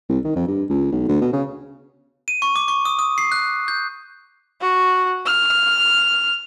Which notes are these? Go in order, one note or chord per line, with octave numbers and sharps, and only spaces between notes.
C2
D#3
F2
G2
C#2
B1
D2
B2
C#3
D#7
C#6
D6
C#6
D#6
D#6
C7
F#6
G6
F#4
F6